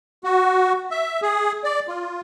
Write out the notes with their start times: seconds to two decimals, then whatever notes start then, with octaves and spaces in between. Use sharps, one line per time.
0.24 F#4
0.91 E5
1.22 G#4
1.64 D5
1.88 F4